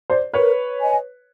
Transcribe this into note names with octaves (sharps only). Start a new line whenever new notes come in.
C5 D5
A#4 B4 C#5
D#5 G#5